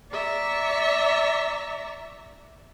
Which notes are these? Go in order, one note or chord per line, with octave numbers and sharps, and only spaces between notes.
D5 E5 A#5 C#6